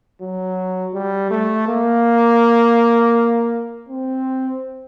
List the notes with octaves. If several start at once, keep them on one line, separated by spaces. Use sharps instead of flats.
F#3
G3
A3
A#3
C4